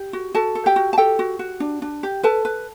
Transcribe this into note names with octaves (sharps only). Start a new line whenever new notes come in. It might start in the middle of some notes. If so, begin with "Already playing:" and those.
Already playing: G4
F#4
F#4 A4 A5
A4
G4 G5
F#4
A5
G4 A4 G5
F#4
F#4
D4
D4
G4
A4 B4 A5
B4